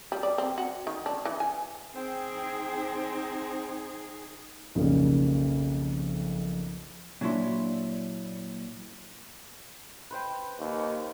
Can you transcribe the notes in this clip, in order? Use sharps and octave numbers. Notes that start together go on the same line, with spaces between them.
G3
D5
C4
F#4
D#3
D4
E3
G#5
C4 D#4 G#4 C5 G5
B1 F2 C#3 G3 A#3
A#2 F#3 D4 E4 C6
B4 C5 G5
D#2